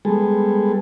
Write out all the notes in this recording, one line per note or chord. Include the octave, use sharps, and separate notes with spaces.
G3 G#3 B3 G#4 A4